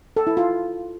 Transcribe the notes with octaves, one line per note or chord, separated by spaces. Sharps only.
A4
E4
F4